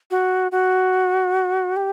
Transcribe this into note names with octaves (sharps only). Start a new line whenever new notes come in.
F#4
F#4
G4